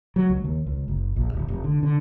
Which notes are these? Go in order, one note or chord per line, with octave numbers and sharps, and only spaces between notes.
F#3
C#2
D#2
C#2
F#1
A#1
D1
F1
D3
D3